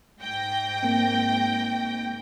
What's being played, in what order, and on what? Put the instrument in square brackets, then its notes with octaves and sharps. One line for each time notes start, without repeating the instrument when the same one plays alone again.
[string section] G#2 G5 A#6
[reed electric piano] A#3 C4